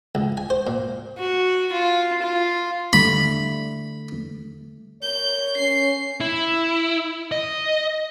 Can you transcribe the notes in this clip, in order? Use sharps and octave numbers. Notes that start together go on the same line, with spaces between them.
C#2
G#5
C5
A#2
F#4
F4
F4
D3 G3 A3 B5
A#4 C#5 G6
C#4 C7
E4
D#5